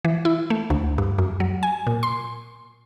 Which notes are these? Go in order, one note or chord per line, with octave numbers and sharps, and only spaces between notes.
E3
E4
A3
D2
G2
F#2
F#3
G#5
A#2
C6